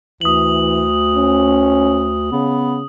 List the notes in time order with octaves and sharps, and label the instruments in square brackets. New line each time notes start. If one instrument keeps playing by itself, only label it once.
[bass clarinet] D2 [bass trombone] E3 [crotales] D#6 F#7
[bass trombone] C#4
[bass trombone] C#3 [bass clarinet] B3